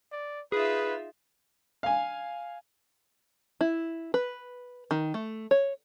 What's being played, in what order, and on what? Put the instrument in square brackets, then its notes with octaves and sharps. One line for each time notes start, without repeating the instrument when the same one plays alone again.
[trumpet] D5
[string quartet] D#4 F4 E5 [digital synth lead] G#4 [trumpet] B4
[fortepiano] F5 G#5
[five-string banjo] E4
B4
D#3
A3
C#5